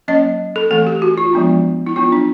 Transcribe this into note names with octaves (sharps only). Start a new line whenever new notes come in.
F#3 A#3 C#4 D#5
A4
E3 A3 C4 A4
G4
F#4
F4
F3 G#3 B3 D4
E4
F#3 B3 D4 F4
D4